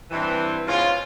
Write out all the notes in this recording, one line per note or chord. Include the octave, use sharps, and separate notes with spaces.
G2 E3 C4
G#2 B2 C#4 F4